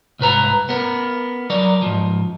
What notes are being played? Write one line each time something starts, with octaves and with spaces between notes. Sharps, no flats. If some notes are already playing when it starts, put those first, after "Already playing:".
C2 G#2 B4 A#5
B3 A#4
F#3 A#4 D5
G#2 F3